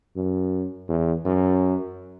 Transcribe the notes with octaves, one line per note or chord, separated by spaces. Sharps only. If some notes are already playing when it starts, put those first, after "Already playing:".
F#2
E2
F#2